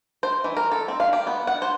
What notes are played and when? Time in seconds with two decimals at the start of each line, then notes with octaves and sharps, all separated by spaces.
0.23 C5
0.44 E3
0.57 A#4
0.72 A4
0.88 C4
1.00 F5
1.13 G4
1.27 B3
1.47 F#5
1.62 C5